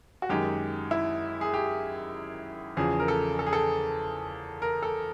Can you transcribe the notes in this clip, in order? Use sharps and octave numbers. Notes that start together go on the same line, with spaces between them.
F#4
F#2 D#3 G#3 G4
E4
G#4
G4
E2 C#3 F3 G#4
A#4
A4
A4
G#4
A4
A#4
A4